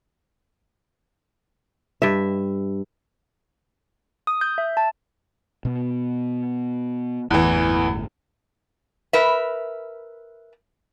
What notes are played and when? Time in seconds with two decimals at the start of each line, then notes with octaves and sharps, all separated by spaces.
2.02 G2 E5
4.27 D#6
4.41 G6
4.58 E5
4.77 A5
5.65 B2 B3
7.30 G1 E2 A2 E3
9.13 A#4 B4 E5